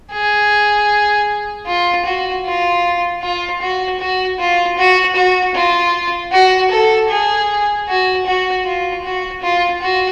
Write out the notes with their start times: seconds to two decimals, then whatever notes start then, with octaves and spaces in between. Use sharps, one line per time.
0.12 G#4
1.67 F4
2.05 F#4
2.45 F4
3.22 F4
3.61 F#4
3.99 F#4
4.39 F4
4.77 F#4
5.16 F#4
5.55 F4
6.32 F#4
6.71 A4
7.10 G#4
7.88 F#4
8.26 F#4
8.65 F4
9.04 F#4
9.42 F4
9.82 F#4